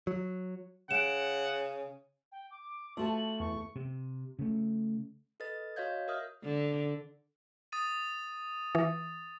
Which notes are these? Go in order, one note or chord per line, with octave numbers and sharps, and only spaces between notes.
F#3
C#3 F#5 D7 E7
G5
D6
A3 F4 F#4 A5 F#7
E2 C#6
C3
C#3 A3
A4 B4 D#5 A6
F#4 C#5 D#5 F5 G6 G#6
A#4 E5 D#6 F6 G6
D3
D#6 A6 D#7
E3